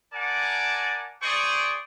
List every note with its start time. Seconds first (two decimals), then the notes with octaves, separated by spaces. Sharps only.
0.13 A#4 D5 F#5 G#5 A5 D6
1.22 G#4 C5 D5 G5 C#6 D#6